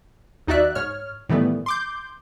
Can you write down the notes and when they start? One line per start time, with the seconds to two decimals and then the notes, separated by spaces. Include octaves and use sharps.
0.47 D#2 D#4 F#4 D5 E5 F#6
0.75 G#2 C#5 F6
1.29 A2 D#3 E3 G3 A3 B3
1.66 C6 D6 G6